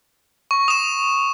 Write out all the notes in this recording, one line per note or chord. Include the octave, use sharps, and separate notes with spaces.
C#6
D#6 E7